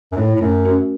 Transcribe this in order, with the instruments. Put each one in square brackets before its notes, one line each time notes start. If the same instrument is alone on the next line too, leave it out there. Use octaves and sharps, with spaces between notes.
[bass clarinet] F#2
[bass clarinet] A2 [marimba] A3 D#4 A4
[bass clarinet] A2
[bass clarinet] F#2 [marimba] A3
[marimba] C#4 F#4 A#4